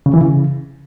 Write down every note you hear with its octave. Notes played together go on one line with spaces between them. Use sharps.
C#3
E3
C#3